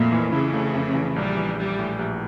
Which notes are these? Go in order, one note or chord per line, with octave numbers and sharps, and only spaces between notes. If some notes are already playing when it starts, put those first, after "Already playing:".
Already playing: F2 A#2 A3 E4
E3
C#3 E4
A3
F2
E3
A#1 G3
E3
A#1 G3
A2
A#1